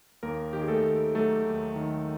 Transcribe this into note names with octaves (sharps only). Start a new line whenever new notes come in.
D#2 A#3 A#4
D#3 G4
G#4
A3 A4
D#2
F#3 A3 A4
D#2
D#3